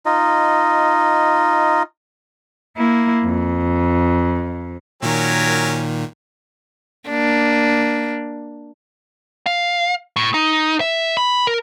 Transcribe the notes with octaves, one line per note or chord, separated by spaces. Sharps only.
D#4 F4 D#5
A#3 E4
F2
A#2 D#3 F#3 C#4 A#4
A#3 D4
F5
A2
D#4
E5
B5
A#4